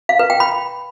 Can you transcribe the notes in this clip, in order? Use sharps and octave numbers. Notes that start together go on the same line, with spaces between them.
F5
B4
G5
B5